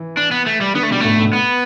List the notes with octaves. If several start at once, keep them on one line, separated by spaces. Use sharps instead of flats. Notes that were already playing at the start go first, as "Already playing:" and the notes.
Already playing: E3
D4
B3
A3
G3
D3 B3
A3
B2 G3
A2 A3
A2
B3